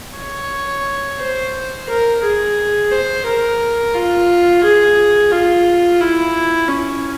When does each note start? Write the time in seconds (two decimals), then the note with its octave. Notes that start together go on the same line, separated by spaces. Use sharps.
0.18 C#5
1.20 C5
1.90 A#4
2.24 G#4
2.91 C5
3.26 A#4
3.95 F4
4.64 G#4
5.32 F4
6.01 E4
6.68 C#4